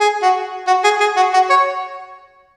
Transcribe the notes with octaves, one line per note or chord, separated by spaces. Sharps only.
G#4
F#4
F#4
G#4
G#4
F#4
F#4
C#5